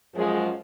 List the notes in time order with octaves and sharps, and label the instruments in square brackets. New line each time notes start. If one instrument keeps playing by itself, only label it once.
[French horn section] F#2 F3 G#3 G#4